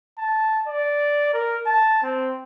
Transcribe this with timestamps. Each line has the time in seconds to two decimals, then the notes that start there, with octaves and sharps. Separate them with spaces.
0.18 A5
0.67 D5
1.33 A#4
1.66 A5
2.03 C4